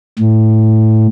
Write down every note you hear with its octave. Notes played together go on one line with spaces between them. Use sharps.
A2